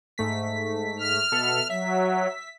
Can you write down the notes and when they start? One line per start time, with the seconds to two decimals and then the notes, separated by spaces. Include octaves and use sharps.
0.18 G#2 A3 B6
1.00 F6
1.32 B2 A4 E5
1.70 F#3 E5 B6